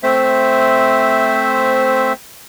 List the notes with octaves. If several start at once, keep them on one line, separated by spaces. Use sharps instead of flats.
A3 C4 C5 E5